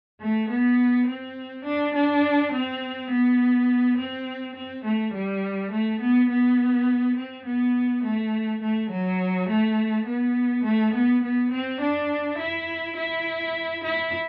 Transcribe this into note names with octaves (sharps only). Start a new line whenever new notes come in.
A3
B3
C4
D4
D4
C4
B3
C4
C4
A3
G3
A3
B3
B3
C4
B3
A3
A3
F#3
A3
B3
A3
B3
B3
C4
D4
E4
E4
E4